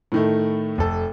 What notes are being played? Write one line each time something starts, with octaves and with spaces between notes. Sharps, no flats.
A2 D#3 A3
F1 A4